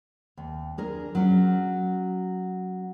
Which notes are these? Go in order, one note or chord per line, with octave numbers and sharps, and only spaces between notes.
D#2
D4 G#4 A#4
F#3 C#4